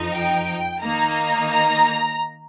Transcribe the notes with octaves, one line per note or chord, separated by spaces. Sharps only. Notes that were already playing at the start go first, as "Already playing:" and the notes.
Already playing: F2 F3 D#4
G5
D#3 A#3 D#4 A#5
A#5